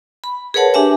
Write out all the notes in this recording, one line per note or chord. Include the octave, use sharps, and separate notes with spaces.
B5
G#4 A#4 B4 C#5 F#5 A5
D4 G4 E5 G#5